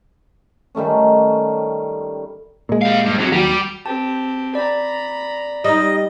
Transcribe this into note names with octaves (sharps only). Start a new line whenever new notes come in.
D#3 G3 A3 C#4
A#2 G#3
G4 F5
G2
F2 F#3
D#2 F#3 G3 G4
C4 G4 A5
D5 A#5 B5
G3 D#4 D#5